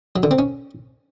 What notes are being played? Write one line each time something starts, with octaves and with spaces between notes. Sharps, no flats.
F#3
D3
C4
C#4